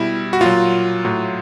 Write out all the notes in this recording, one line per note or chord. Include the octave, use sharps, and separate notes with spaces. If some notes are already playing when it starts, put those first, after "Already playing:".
Already playing: B2 G3 E4
F#4
A#2 F#3 F4
A2 F#3